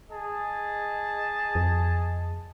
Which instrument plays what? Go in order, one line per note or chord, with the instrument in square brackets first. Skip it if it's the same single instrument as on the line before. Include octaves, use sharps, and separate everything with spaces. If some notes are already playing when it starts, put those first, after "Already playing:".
[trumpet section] G#4 D#5 A5
[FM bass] F2